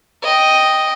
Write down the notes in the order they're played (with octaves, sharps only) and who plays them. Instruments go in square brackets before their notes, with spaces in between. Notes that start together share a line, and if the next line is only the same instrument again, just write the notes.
[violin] D#5 G5